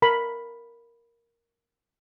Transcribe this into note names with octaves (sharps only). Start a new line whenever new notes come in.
A#4 B5